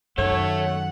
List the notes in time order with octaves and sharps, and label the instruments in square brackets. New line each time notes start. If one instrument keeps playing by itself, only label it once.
[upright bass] F#2 D#3 [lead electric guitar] A3 A4 [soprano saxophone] C#5 [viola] F#5